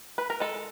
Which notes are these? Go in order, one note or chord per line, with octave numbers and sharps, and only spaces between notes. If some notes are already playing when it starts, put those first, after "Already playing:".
B4
A#4
G#3 A4